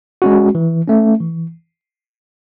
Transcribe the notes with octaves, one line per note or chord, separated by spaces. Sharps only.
G#3 C#4 F#4
E3
A3 C#4
E3